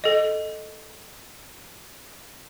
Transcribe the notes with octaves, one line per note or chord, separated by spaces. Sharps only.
A4 D#5